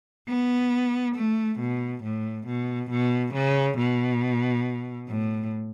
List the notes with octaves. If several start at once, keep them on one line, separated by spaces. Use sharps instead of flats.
B3
A3
B2
A2
B2
B2
C#3
B2
A2